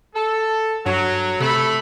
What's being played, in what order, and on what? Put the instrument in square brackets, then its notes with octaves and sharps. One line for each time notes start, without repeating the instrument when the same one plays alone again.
[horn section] A4
[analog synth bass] G2 [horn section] F#3
[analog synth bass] C3 [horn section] A3 A4 B5